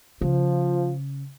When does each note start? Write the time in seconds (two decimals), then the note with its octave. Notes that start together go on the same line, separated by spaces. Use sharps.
0.21 C#3 F3